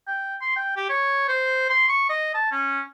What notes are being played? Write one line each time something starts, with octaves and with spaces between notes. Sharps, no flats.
G5
C6
G5
G4
C#5
C5
C6
C#6
D#5
A5
C#4